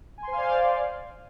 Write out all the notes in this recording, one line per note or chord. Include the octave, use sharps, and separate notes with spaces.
C5 D5 F5 G#5 C6